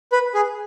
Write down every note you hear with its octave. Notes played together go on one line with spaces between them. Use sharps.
B4
G#4